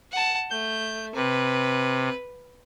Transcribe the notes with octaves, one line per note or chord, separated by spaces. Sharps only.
F#5 A5
A3 G6
C3 B4